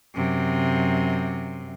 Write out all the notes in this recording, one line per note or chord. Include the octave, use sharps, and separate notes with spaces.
F#2 C3